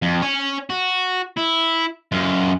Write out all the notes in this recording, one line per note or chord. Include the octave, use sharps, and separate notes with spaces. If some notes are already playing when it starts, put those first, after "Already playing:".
F2
C#5 G#5
F#4
E4
F#2 F4